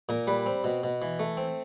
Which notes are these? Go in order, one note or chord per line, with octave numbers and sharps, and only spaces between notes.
A#2 A#4
G3 B4
C4
B2
B2
E3
A3
C4